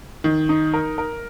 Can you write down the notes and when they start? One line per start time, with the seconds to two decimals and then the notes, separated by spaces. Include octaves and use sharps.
0.24 D#3
0.49 D#4
0.74 A#4
0.98 A#4